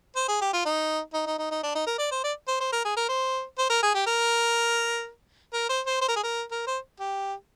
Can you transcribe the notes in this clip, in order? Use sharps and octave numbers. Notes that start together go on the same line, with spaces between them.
C5
G#4
G4
F4
D#4
D#4
D#4
D#4
D#4
D4
D#4
A#4
D5
C5
D5
C5
C5
A#4
G#4
A#4
C5
C5
A#4
G#4
G4
A#4
A#4
C5
C5
C5
A#4
G#4
A#4
A#4
C5
G4